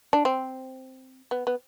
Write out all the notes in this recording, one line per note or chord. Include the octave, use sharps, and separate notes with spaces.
D4
C4
B3
B3